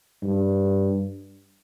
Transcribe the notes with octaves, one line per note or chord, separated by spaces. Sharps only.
G2